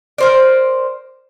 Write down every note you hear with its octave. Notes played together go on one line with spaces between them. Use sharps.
A#4 C5 D5